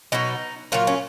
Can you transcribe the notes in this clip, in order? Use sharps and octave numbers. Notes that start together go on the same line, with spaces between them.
B2 F#3 D#4
A#2 F#3 F4
C#4